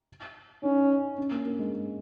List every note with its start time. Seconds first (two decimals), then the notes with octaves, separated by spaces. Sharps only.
0.63 C#4 D#4
1.18 C#4
1.31 A#3
1.45 A#3
1.59 G#3